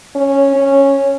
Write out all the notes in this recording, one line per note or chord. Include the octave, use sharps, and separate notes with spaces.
C#4
C#4